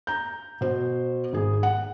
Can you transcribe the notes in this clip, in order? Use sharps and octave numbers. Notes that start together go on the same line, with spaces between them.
A#5 G6
B2 C5
G#1 G#4
F#5